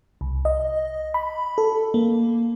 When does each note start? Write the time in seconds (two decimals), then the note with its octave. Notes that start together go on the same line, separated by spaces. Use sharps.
0.21 C2
0.45 D#5
1.14 B5
1.58 A4
1.94 A#3